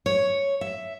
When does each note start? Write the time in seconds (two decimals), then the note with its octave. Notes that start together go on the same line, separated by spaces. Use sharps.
0.06 C#5
0.61 E5